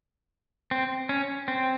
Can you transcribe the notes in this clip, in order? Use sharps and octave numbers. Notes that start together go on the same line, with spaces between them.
C4
C#4
C4